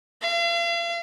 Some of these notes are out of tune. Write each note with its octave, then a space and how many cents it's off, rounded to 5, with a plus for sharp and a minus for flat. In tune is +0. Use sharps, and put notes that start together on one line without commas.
F5 -40